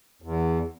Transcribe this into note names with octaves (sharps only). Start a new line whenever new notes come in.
E2